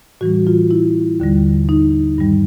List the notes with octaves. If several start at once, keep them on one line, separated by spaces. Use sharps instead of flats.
A2 E3 G3 F#4
F4
E4
D#2 D3 G3
D#4
G2 D#3 G3